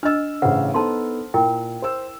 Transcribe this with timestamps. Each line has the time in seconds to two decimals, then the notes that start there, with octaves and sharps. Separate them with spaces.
0.03 D4 D#5 E6 F6
0.42 A1 C#3 B4 C5 F#5
0.74 B3 D#4 A4 C5 A5 C6
1.34 A#2 E4 A#4 G5
1.82 C5 E6